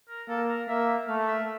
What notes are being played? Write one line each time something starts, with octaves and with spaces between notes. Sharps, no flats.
A#4
A#3 A4
A#4
A#3 E5
A3 F5
E5